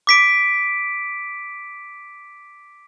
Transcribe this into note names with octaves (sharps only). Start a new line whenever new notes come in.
D6 B6 D7